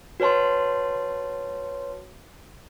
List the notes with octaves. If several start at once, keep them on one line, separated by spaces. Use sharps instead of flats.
F#4 B4 C#5 A5 C6